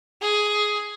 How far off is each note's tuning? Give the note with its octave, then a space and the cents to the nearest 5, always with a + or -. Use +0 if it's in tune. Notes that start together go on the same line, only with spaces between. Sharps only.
G#4 +10